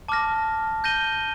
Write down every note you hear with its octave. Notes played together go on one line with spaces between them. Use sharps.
A5 D6 F6 A#6
G6 A#6 D#7 G7